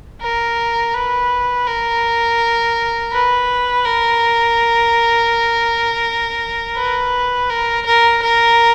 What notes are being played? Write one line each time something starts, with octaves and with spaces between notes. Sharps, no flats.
A#4
B4
A#4
B4
A#4
B4
A#4
A#4
A#4